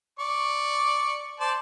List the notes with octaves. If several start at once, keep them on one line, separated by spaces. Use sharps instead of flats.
D5 C#6
C5 D5 A5